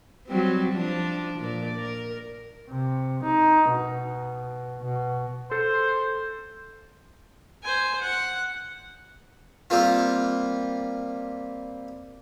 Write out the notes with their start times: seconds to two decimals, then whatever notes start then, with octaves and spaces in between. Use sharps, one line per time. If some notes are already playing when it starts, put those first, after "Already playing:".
0.27 F#3 G3 C4
0.71 F3 D4
1.40 A#2 A#4 D5
1.74 A#4
2.69 C3
3.24 D#4
3.70 B2
4.84 B2
5.51 A4 C5
7.63 C5 G#5
8.01 F#5
9.70 G3 A#3 C4 F4